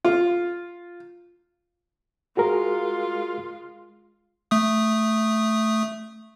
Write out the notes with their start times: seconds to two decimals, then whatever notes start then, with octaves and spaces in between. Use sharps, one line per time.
0.05 F4
2.37 G#3 F4 F#4 G#4 A#4
4.51 A3 D#6